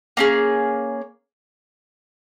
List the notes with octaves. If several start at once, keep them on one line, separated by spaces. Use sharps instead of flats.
A#3 C#4 G#4